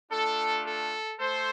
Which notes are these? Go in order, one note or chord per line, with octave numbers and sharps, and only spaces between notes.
A3 D4 F4 A4
A4
A3 A4 C5